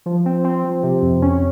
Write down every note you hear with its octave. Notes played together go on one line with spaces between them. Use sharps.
F3
C4
C4
F3
C3
F2
C#4